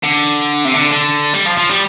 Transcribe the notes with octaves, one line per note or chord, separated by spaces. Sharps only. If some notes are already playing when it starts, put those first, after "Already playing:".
D3
C3
D3
D3
G3
F3
F3
G3